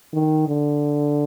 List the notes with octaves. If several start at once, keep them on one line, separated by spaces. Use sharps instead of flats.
D#3
D3